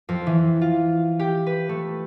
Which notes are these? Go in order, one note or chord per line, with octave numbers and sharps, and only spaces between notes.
F2
E3
F4
G4
B4
A3